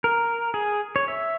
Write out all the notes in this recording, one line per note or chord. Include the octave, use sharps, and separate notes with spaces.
A#4
G#4
C#5
E5